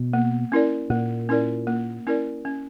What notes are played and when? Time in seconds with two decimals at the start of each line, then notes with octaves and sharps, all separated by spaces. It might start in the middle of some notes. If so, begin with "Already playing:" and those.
Already playing: B2
0.13 A#3
0.52 C#4 E4 A#4 D5
0.90 A#2 A#3
1.29 C#4 E4 A#4 D5
1.67 A#3
2.07 C#4 E4 A#4 D5
2.45 C#4